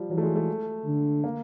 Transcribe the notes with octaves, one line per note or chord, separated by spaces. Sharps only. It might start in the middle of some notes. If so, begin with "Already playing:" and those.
Already playing: F3 G3
E3 F#3
A3
G#3
A3
D3
A#3